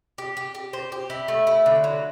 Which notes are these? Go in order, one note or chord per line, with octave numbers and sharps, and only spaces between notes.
G4
G4
G4
C5
G4
E4
A3
E4
D3
F#3